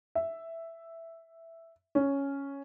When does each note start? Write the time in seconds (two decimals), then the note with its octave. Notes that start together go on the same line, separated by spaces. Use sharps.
0.15 E5
1.95 C#4